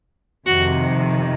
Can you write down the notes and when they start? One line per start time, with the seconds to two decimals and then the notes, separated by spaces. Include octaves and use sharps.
0.46 F2 C3 D#3 F#4